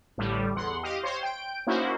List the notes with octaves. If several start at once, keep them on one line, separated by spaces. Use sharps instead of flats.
A1 A2 D3 G3
E2 F#5 C6
G4 D#5 F5
C5 C#5 C6
G5 D7
A#3 C#4 D#4 E4 F#4 C5